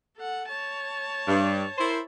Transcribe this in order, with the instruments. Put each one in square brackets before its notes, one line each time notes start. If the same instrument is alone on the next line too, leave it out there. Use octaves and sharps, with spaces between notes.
[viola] A4 F#5
C#5 A5
[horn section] G2
E4 A#4 C5